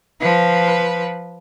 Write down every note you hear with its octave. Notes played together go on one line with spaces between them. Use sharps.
F3 B4